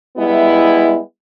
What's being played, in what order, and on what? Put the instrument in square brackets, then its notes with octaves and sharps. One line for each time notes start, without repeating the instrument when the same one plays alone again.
[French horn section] G3 G#3 B3 E4